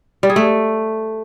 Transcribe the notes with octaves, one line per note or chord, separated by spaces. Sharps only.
G3
G#4
A3